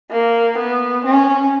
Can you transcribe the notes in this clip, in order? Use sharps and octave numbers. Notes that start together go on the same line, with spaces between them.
A#3
B3
C#4